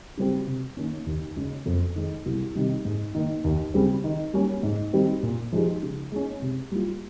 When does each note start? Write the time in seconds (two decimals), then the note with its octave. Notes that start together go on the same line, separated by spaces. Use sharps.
0.17 C#3 G3 C4 G4
0.47 C3
0.77 D#3 A#3 C#4
1.06 D#2
1.36 C#3 G#3 C#4
1.66 F2
1.96 D#3 G#3 D#4
2.26 C2
2.55 C3 D#3 G3
2.85 G#2
3.15 D#3 A#3
3.44 D#2
3.74 C#3 G3 C4
4.04 D#3
4.34 G3 A#3 C#4
4.63 G#2
4.93 D#3 G3 C4 G4
5.23 A#2
5.52 F3 G#3 D#4 G4
5.82 C#3
6.12 G#3 C#4
6.42 C3
6.71 G3 A#3 F4